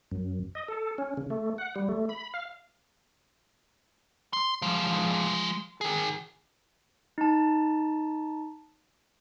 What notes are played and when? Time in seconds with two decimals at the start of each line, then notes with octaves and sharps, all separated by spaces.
0.11 F#2
0.55 D#5
0.68 A4
0.98 C#4
1.17 C#3
1.30 A3
1.58 F#5
1.76 G3
1.89 A3
2.09 B5
2.34 F5
4.33 C6
4.62 F3 G#3
5.81 D#3 G#4
7.18 D#4 A5